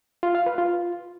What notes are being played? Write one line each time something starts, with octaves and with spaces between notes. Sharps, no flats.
F4
F5
B4
F4